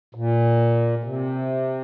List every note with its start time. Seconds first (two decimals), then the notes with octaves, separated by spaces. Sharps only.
0.15 A#2
1.04 C3